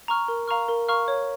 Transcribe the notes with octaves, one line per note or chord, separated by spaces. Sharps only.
A#5 C#6 F6
A#4
F5 A#5 C#6 F6
A#4
F5 A#5 C#6 F6
C#5